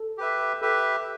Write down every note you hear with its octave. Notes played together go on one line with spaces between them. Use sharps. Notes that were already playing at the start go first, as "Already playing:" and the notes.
Already playing: A4
G4 B4 E5
G4 A4 B4 E5